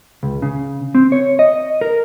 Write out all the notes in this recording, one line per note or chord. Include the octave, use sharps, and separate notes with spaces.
C#2
C#3
C4
C#5
D#5
A#4